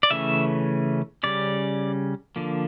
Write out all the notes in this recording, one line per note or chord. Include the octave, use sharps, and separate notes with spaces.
D5
C#3 E3 A3 C#4 E5
C#3 G3 C#4 D5
D3 F3 A#3